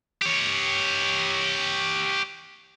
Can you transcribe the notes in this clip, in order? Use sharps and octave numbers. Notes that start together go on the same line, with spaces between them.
G4 C#5